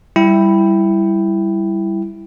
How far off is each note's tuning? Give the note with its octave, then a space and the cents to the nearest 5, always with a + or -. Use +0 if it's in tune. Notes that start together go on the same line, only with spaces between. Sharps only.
G3 +0 E4 +0 G5 +0